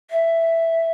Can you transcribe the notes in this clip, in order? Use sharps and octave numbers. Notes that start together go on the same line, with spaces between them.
E5